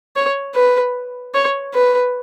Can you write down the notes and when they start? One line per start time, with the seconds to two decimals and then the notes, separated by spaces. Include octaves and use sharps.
0.16 C#5
0.55 B4
1.34 C#5
1.74 B4